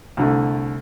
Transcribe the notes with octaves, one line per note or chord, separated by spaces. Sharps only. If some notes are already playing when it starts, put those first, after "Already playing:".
C2 D3 A3